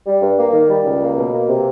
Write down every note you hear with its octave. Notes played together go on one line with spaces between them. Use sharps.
G3
G2
A#3
D#3
G3
C#2
A#3
B2
A#3
C3